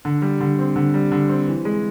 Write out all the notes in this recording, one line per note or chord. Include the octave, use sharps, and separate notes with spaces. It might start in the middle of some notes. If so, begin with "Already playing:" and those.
D3
G3
D3
C4
D3
G3
D3
C4
E3
G#3